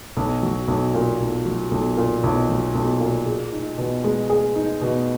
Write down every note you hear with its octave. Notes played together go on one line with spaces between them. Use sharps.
B1
F#3
B1
A#2
B1
F#3
B1
A#2
B1
F#3
B1
A#2
G#4
D#4
B2
G#3
G#4
D#4
B2